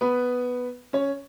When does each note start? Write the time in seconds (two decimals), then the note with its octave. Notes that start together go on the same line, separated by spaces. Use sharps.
0.01 B3 B4
0.93 C#4 C#5